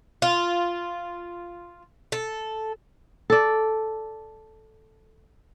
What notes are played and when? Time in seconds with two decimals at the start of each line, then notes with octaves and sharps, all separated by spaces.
0.22 F4
2.12 A4
3.30 A4 D5